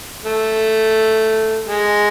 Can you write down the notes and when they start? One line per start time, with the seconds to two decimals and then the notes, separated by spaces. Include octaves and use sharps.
0.25 A3
1.68 G#3